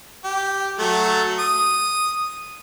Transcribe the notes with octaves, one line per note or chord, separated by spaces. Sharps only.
G4
F#3 A3 A4
D#6